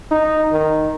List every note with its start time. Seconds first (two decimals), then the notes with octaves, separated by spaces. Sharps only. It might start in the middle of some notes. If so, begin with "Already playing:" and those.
0.11 D#4
0.52 D#3